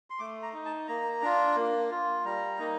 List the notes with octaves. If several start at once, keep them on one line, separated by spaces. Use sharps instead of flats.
C6
A3 D6
A#5
D#4
A5
A#3 A#5
D4 F4
A#3
F4
G3 A#5
A#3 D#4